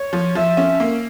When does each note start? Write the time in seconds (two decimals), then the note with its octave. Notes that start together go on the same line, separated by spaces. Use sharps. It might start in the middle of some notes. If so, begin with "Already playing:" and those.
Already playing: C#5
0.13 F3
0.35 F3 E5
0.57 C#4
0.80 A#3